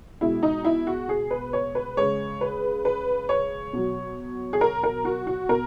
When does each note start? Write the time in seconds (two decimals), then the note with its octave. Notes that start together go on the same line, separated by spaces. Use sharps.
0.21 B2 G#3 E4
0.43 D#4
0.64 E4
0.87 F#4
1.09 G#4
1.31 B4
1.53 C#5
1.75 B4
1.97 C#3 G#3 C#5
2.41 B4
2.85 B4
3.29 C#5
3.73 B2 F#3
4.53 G#4
4.61 A#4
4.83 A#4
5.05 F#4
5.27 F#4
5.49 B2 A#4